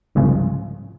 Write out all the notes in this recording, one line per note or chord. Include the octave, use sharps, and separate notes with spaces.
G1 C2 G#2 C#3 F3